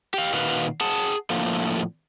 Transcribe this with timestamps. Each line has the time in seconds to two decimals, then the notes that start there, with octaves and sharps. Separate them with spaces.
0.14 G4 F5
0.33 A#2 D#3 F#4 B4 F5
0.81 G#4 F#5 A5
1.30 A2 D3 F3 A3 A#3